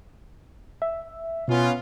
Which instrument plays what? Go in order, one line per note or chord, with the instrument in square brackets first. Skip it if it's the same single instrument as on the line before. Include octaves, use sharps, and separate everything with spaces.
[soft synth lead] E5
[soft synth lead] B2 [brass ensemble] B3 C#4 F4